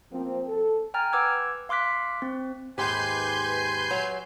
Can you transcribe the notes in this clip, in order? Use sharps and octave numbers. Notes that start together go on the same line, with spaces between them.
F3 A#3 C4
A4
G5 G#5 A#5 F6 A6
B4 F#5 D6 E6 G#6
F5 C6 D6 F#6 B6
C4
D#2 G#2 G4 B4 G#5 C6 G6
F#3